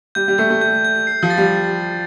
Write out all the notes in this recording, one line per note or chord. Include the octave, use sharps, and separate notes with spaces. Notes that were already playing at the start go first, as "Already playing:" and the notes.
G3 G6
G3
A3 G6
A3
G6
G6
C7
F3
A6
G3